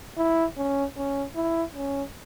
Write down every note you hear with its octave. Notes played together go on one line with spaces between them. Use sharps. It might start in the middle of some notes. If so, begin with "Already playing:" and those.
E4
C#4
C#4
E4
C#4